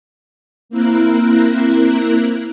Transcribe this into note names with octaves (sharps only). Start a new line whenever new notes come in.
A#3 C4 E4 A#4 F#6